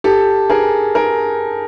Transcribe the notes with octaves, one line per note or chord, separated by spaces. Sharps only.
G4 A4
G#4 A#4
G#4 A#4